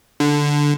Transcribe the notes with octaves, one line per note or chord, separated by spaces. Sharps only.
D3